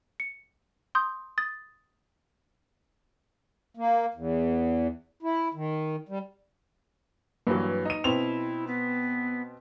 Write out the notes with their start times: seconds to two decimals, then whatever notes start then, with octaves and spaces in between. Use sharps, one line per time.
0.20 C#7
0.95 C6 D#6 G6
1.38 D#6 A6
3.77 A#3
4.14 E2
5.23 E4
5.54 D#3
6.09 G3
7.47 G2 E3 F#3 A#3 B4
7.85 D#4 D#7
8.04 B2 C4 E4 F7
8.67 B3